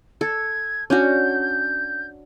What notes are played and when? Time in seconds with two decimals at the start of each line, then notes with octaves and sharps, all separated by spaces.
0.21 A4 G#6
0.90 C#4 D4 F#4 G6